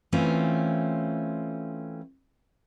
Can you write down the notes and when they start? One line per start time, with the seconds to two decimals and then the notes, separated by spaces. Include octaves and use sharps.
0.12 E3 A3 C4 C#4 F4